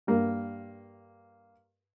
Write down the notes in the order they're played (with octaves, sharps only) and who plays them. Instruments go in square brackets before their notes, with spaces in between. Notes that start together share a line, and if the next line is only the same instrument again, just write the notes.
[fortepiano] G2 A#3